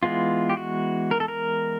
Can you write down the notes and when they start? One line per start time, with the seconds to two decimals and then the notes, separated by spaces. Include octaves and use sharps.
0.03 E3 G#3 B3 F4
0.50 G4
0.57 F#4
1.11 A#4
1.20 A4
1.28 A#4